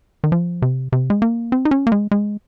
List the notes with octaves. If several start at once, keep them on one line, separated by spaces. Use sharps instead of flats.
D#3
F3
C3
C3
G#3
A#3
C4
D#4
C#4
A#3
G#3
G#3